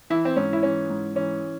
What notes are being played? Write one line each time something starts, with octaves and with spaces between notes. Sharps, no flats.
E3 E4
C4
G#2 C#4
E4
E3 C#4
G#2
E3 C#4